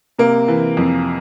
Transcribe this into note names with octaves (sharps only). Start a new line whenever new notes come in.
C3 A#3
E3
F2